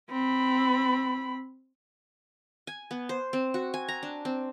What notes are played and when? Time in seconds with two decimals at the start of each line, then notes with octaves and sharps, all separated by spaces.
0.10 C4 B5
2.67 G#5
2.91 B3
3.09 C5
3.33 C4
3.54 F#4
3.74 G#5
3.88 A#5
4.03 D4
4.25 C4